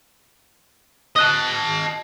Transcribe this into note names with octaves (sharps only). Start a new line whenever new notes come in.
D#5 A5 D#6 F#6